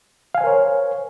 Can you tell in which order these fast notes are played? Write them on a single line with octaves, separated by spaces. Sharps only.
F5 G#5 C5 A#4 C#5